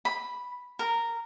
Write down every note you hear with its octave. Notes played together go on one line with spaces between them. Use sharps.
B5
A#4